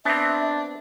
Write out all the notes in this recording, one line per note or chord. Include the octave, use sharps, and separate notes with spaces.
B3 C4 D4 E5